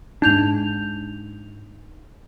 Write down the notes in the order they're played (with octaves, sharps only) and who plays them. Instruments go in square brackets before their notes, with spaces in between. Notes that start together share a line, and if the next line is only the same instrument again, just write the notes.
[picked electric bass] G#2 D4 [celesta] D#4 G6 F7